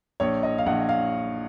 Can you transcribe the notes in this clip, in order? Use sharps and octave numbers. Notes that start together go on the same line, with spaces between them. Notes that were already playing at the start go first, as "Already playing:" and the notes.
A#1 C#5
D#5
F5
A#1 F#5
F5